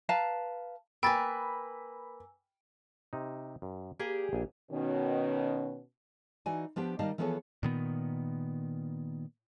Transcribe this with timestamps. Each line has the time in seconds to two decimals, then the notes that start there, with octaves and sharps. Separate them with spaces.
0.09 B4 F5 A5 A#5
1.03 A#3 B4 G5 G#5 B5 E6 A6
3.13 C3 D#4
3.62 F#2
4.00 A#3 G4 G#4 D5 G#5
4.33 A#1 G#5
4.72 B2 D#3 C#4
6.46 E3 D#4 F#4 D5 G#5
6.76 F3 B3 D4 G4
6.99 D#3 G3 D#4 D5 F5 A5
7.18 E3 F3 B3 G#4 A4 C#5
7.63 A#2 D#3 B3